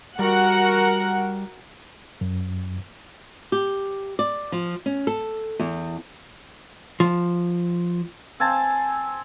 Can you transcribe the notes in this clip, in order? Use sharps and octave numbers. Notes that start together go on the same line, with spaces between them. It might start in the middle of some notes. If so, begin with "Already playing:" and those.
G3 F#4 A#4 F#5
F#2
G4
D5
F3
C#4
A4
E2
F3
C4 G#5 A5